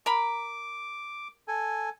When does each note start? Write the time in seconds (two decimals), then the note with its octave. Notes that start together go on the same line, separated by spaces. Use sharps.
0.06 A#4 A#5 B5 D6
1.48 A4 G#5